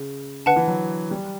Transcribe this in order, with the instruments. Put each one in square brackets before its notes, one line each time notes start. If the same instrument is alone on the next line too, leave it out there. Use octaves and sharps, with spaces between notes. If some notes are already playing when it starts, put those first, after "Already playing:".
Already playing: [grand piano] C#3
[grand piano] D3 [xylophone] B4 F#5 A5
[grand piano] E3
F#3
G3